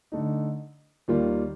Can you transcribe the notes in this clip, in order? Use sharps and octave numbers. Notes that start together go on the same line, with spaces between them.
D3 A3 D#4
D#2 D#3 G3 A#3 F4